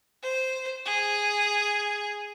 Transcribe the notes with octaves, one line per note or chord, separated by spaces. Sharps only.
C5
G#4